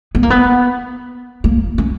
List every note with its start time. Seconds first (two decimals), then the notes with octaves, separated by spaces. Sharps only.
0.15 B3
0.23 A#3
0.30 B3
1.44 A#3
1.78 C#4